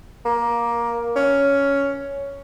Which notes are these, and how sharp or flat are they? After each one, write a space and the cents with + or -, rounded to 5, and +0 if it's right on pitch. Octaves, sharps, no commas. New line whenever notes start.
A#3 +15
C#4 +10